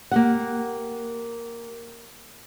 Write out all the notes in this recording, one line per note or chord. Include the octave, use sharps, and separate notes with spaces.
A#3 G4 F#5